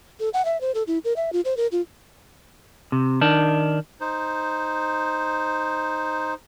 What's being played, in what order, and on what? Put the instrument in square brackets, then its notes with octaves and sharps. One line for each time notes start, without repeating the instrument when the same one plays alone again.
[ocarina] A4
F#5
E5
C5
A4
E4
A#4
E5
F4
C5
A#4
F4
[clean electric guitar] C3
D#3 D4
[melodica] D#4 C5